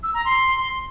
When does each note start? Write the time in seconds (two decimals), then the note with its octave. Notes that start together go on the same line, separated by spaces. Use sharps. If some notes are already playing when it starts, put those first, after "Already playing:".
0.03 E6
0.14 A#5
0.25 C6